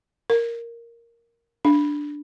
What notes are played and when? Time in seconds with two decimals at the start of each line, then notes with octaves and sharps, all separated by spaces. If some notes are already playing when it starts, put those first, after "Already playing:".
0.30 A#4
1.65 D4